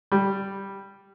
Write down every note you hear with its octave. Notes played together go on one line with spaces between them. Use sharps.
G3